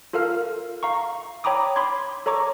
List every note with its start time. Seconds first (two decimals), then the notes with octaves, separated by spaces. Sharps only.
0.13 F4 A4 A#4 F5 F6
0.83 F5 A#5 C#6
1.44 C#5 G5 A#5 B5 D6 D#6
1.76 B5 C6 D6 G#6
2.26 A4 C#5 A#5 C#6 D6